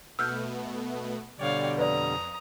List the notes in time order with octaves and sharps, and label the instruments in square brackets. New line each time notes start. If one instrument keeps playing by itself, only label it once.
[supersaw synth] B2 A3 B3 [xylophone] E6 F6 G6
[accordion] B2 D3 G3 [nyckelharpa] C#5 F5 [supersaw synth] D5 G5
[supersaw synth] F2 [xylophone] B4 D5 [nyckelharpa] A#5 D#6